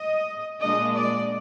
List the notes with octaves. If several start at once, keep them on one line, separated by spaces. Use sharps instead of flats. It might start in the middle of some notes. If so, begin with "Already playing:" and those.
Already playing: D#5
A#2 G#3 D4 D#5
D5